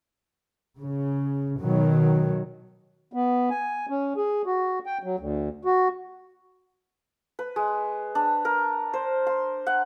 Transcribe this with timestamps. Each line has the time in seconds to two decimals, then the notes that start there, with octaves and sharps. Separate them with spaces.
0.80 C#3
1.61 B2 D#3 F#3
3.13 B3
3.50 G#5
3.89 C#4
4.16 G#4
4.46 F#4
4.86 G5
5.03 F#3
5.19 D2
5.65 F#4
7.39 B4
7.56 G#3
8.15 D4
8.45 A#4
8.93 C5
9.27 C6
9.67 F#5